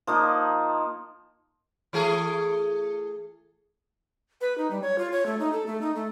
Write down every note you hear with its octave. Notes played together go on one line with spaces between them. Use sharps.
F3 A#3 D#4
E3 A3 G#4
B4
D#4
G3
C#5
F4
C#5
A3
D#4
A4
A3
D#4
A3